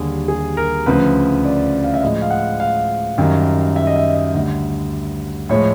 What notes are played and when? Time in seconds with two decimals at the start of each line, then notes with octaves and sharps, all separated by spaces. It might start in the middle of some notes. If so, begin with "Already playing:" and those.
Already playing: D#2 D3 G3 G#4
0.28 G#4
0.57 A#4
0.86 D2 C#3 F3 B4
1.45 D5
1.84 F5
1.94 E5
2.02 A2 F3 G#3 D#5
2.22 F5
2.30 F#5
2.60 F5
3.18 F#2 D#3 G3
3.76 E5
3.87 D#5
3.96 E5
4.15 D#5
4.34 D2 D3 G3
5.49 A2 F3 G#3 C#5